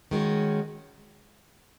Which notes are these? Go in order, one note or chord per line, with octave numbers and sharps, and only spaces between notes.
D#3 G#3 C#4 F#4